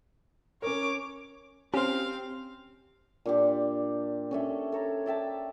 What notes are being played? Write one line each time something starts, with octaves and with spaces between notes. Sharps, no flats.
C#4 A#4 C#5 D6
C4 C#4 G4 C5 F5
A#2 D4 G4
C#4 A4 E5
A4 C#5 A#5
D5 E5 G5 A5